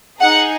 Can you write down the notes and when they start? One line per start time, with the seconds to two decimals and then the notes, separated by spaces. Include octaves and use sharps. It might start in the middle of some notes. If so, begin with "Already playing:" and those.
0.20 D#4 G#4 F#5